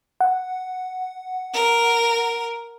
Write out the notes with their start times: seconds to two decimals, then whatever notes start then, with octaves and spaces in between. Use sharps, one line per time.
0.21 F#5
1.54 A#4